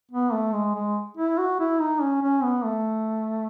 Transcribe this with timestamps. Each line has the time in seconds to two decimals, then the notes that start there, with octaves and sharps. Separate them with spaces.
0.11 B3
0.33 A3
0.53 G#3
0.75 G#3
1.17 E4
1.38 F#4
1.60 E4
1.80 D#4
2.02 C#4
2.22 C#4
2.43 B3
2.65 A3